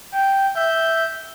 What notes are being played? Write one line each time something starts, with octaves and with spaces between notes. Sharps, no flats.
G5
E5 G6